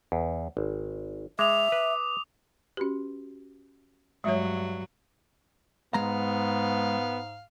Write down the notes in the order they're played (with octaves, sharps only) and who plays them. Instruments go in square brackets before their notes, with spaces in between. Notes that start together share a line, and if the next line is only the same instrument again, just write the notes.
[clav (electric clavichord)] E2
G#1
[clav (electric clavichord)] G#3 [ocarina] E5 [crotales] D6 D#6 F7
[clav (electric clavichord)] B4
[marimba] C#4 G4 [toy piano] F#4 B4
[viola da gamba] G2 F#3 [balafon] G#3 C#5 [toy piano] E5 D#6 E6
[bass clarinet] G#2 [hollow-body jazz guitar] G#3 A#5 [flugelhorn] B3 [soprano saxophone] F5